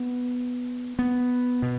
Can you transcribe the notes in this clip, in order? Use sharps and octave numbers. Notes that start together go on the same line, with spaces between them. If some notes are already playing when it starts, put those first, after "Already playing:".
Already playing: B3
B3
B2